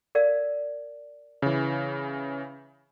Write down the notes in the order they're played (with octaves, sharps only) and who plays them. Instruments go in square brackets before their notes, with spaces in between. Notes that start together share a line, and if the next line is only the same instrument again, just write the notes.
[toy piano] A#4 D5 F5
[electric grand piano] C#3 E3